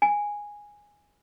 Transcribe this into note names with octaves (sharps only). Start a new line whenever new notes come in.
G#5